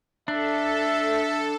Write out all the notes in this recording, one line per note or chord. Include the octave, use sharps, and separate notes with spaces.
D4 A4 E5